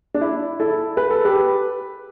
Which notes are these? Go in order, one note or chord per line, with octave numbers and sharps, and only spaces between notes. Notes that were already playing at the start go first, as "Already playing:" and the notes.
D4
E4
E4 A4
B4
A4
G4 B4